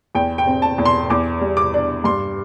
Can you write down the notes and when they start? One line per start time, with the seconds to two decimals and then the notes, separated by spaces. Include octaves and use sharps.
0.15 E2 G5
0.38 G5
0.47 C4
0.62 A5
0.78 E2
0.86 C6
1.10 E2 D6
1.41 G3
1.57 D6
1.74 D4
2.04 G2 C6